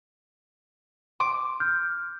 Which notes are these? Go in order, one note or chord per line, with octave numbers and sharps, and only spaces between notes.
C6 D6
F6 G6